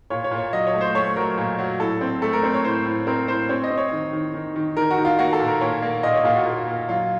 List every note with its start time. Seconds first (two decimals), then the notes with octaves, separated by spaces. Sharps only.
0.10 A#2 C#5
0.24 C#5
0.31 A#2
0.38 C#5
0.53 F#3 D#5
0.67 C#5
0.74 A3
0.81 C5
0.95 A3 C#5
1.16 F#3 A#4
1.38 A#2
1.59 F#3
1.80 A2 A4
2.01 C4
2.22 A3 A4
2.33 A#4
2.43 C4
2.54 C#5
2.64 A2 C5
2.86 A2
3.07 C4 A#4
3.28 A2 C5
3.49 C4 C#5
3.63 D#5
3.70 C4
3.77 C#5
3.92 D#3
4.13 D#3
4.34 D#3
4.56 D#3
4.77 D#3 A#4
4.91 F#4
4.98 D#3
5.05 F4
5.19 A#3 F#4
5.33 A4
5.40 A#2
5.47 A#4
5.61 A#2 C#5
5.82 A#3
6.03 A#2 D#5
6.14 C#5
6.24 A#2 F4
6.36 F#4
6.46 A#2
6.67 A#2
6.89 F#3 F4